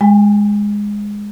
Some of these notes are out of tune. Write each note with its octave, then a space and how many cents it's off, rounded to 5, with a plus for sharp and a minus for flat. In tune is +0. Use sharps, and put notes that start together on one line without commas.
G#3 -10 G5 +40